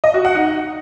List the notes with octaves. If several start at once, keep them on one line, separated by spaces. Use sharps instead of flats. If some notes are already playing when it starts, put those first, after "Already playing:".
D#5
F#4
F#5
D#4